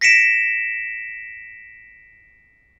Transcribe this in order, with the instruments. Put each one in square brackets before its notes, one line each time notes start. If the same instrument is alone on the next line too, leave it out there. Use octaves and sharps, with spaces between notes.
[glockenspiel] A#6 B6 C#7 D7 E7